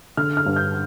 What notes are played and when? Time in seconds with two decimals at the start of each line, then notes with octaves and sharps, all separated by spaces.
0.17 D3 F6
0.37 F6
0.46 G2
0.56 G6